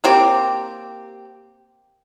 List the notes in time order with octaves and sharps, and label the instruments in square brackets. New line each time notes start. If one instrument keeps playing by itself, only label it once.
[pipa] A#3 C4 G4